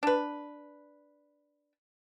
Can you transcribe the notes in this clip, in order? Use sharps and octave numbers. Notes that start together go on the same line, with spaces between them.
D4 B4